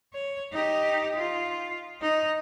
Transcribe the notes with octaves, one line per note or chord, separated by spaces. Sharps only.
C#5
D#4 G4
F4
D#4